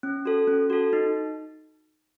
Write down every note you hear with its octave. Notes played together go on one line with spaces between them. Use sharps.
C#4
F#4 A4
C#4
F#4 A4
D#4